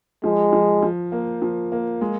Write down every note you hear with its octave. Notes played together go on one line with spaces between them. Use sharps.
F3 G#3
F3
F3
A#3
F3
A#3
G#3